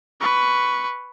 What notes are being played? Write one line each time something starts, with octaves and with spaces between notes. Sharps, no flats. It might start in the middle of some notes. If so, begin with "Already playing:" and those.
B4 C#6